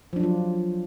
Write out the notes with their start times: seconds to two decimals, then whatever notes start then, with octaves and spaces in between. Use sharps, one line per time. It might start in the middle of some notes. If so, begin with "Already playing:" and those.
0.13 F3
0.16 D4
0.20 F#3
0.23 F4